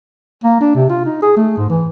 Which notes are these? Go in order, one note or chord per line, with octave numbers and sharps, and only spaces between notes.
A#3
D4
C3
F4
D#4
G#4
A3
G#2
E3